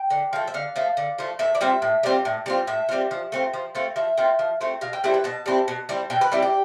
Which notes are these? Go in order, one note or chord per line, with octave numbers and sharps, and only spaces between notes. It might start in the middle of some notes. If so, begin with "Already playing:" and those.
Already playing: G5
D3
F3 A3
E5
D3 F5
F3 A3
D3
F3 A3
A2 E5
D5
G3 C4 F4 E5
A2
G3 C4 F4
A2
G3 C4 F4
A2 E5
G3 C4 F4
F3
A3 C4 F4
F3
A3 C4 F4
F3 E5
A3 C4 F4
F3
A3 C4 F4
B2 F5
G5
G3 C4 E4 A4
B4
B2 A5
G3 C4 E4
B2
G3 C4 E4
B2 G5
B4
G3 C4 E4 G4
G4